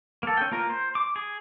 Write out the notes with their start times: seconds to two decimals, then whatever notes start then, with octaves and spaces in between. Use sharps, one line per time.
0.23 A#3 A4
0.37 C#4 G5
0.52 A#3 F4 A#4
0.70 C5
0.95 D6
1.16 G#4